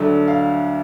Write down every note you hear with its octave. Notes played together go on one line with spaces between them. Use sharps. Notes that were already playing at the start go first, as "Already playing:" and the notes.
Already playing: D2 D3 F#3 A3 D4
F5